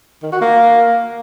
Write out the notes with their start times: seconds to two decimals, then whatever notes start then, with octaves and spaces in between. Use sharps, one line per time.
0.23 D#3
0.32 F#4
0.42 A#3